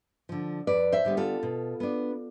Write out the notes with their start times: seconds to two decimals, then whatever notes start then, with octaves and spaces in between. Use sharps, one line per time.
0.29 D3 F3
0.67 F2 B4 D5
0.92 C5 E5
1.05 D3 G3 B3
1.17 F4 A4
1.43 B2
1.80 B3 D4